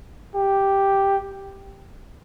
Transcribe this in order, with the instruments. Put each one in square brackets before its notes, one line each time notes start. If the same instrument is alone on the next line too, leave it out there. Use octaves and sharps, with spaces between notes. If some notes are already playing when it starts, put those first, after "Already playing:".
[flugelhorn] G4